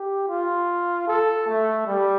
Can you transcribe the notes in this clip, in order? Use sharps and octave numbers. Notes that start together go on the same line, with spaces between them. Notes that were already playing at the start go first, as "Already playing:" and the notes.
Already playing: G4
F4
A4
A3
G3